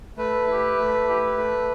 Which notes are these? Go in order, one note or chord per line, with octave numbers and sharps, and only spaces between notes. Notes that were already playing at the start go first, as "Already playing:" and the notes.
A3 B4
E4 G4
A3
E4 G4
A3